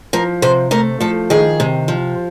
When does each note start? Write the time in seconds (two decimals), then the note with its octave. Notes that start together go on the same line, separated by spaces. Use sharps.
0.13 F3 A#4
0.42 C3 C5
0.71 A3 A#4
1.01 F3 A4
1.30 D#3 G#4
1.60 C3
1.88 F3